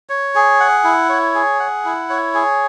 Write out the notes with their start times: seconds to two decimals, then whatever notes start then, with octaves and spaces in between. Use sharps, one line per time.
0.09 C#5
0.35 G#4
0.60 F#5
0.84 E4
1.09 C#5
1.35 G#4
1.60 F#5
1.85 E4
2.10 C#5
2.34 G#4